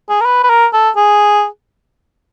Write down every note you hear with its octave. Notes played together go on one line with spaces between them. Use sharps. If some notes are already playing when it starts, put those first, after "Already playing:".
G#4
A#4
B4
B4
A#4
A4
G#4